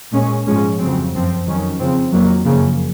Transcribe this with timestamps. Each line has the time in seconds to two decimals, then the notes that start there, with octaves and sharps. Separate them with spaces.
0.13 A#2 G#3 C#4
0.47 G#2 F3 G#3 C#4
0.79 F2 C#3 F#3 C4
1.13 F#2 F3 C4
1.46 F2 D#3 F#3 C#4
1.79 C#3 F3 C4
2.12 F2 D#3 F#3 A#3
2.45 F#2 C#3 F3 A#3